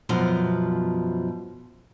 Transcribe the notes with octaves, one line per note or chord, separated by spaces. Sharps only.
F#2 B2 F3